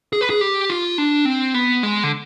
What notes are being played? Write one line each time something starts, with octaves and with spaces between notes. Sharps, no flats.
G#4
B4
G#4
G4
F4
D4
C4
B3
G#3
D3